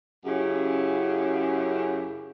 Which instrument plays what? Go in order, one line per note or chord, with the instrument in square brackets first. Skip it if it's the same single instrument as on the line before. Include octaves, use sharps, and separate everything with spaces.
[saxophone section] F#2 C#3 E4 G4 G#4